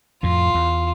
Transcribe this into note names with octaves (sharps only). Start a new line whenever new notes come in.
F2 A2 F4
E2